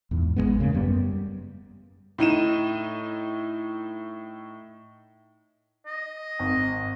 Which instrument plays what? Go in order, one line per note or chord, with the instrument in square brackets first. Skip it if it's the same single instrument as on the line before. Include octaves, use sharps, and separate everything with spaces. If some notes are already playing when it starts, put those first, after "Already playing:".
[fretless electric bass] E2 G#2
G#1 G2 G#3 B3
C#3 A#3
F#2 G3 B3
[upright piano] A2 D#4 D#7 E7
[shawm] D#5
[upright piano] G#1